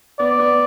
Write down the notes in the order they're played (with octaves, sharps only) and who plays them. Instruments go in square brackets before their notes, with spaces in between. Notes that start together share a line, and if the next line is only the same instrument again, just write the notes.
[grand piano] B3 [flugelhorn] D5
[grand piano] B3